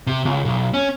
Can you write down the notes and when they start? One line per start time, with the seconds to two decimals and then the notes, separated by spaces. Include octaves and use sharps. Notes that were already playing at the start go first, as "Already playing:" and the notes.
0.07 C3
0.25 C#2
0.45 B1
0.74 C#4